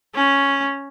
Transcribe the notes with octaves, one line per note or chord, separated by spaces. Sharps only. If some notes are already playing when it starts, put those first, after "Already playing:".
C#4